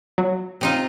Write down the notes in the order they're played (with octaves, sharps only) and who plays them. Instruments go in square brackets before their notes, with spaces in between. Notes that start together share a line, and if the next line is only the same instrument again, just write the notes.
[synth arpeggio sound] F#3
[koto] C3 D#4 F4